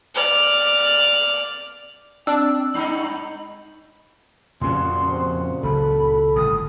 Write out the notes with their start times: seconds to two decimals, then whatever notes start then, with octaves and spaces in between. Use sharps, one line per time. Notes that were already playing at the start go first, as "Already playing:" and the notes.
0.15 D5 F6
2.27 C4 D4 E6
2.74 G2 D#4 B5
4.61 F2 A#2 C#3 C#4 F#4 C6
5.11 C4
5.63 C#2 F#3 A4 B5
6.36 G1 A2 D#6